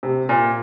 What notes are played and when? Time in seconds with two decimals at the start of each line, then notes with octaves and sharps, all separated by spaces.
0.03 C3
0.29 A#2